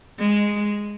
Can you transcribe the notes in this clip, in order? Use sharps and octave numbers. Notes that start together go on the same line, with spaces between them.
G#3